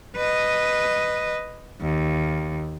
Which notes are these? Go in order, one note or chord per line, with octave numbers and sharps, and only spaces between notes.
B4 D#5
D#2